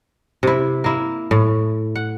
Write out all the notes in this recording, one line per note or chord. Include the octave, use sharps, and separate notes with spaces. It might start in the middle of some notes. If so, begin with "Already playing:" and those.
C3 E4
A#3 E4
A2
F#5